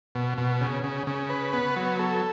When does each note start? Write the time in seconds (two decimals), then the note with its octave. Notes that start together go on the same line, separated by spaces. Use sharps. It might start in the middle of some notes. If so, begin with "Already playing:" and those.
0.15 B2
0.38 B2
0.61 C#3
0.84 C#3
1.07 C#3
1.29 B4
1.53 B3
1.76 F#3
1.99 A4